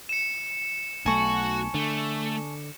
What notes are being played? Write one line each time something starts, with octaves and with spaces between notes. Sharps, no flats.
C#7 E7
B1 A3 F#4 G#5 A5 C#6
D3 A3